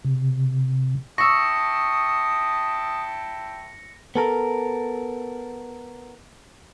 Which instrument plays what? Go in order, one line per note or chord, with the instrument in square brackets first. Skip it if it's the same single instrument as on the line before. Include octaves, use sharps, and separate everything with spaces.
[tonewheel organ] C3
[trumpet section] E4 G5 A5 [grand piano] C#6 E6 [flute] D#6 [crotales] A#6 C#7
[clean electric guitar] B3 A4 A#4